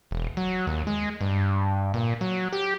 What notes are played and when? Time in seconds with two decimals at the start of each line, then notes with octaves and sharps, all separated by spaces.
0.11 E1
0.37 F#3
0.67 D#2
0.87 G#3
1.21 G2
1.94 A#2
2.21 F#3
2.53 G4